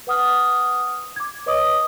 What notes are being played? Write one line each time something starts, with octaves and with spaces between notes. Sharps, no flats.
B4 F#5 D#6 F6
D6 G#6
B4 C#5 D#5 D6 D#6